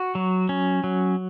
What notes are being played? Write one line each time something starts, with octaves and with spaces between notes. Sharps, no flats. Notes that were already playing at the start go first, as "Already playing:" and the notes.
Already playing: F#4
F#3
C#4
F#3